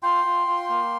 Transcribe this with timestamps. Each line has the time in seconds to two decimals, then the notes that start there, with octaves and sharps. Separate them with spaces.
0.03 F4 G5 C6
0.24 F4
0.47 F4
0.69 A#3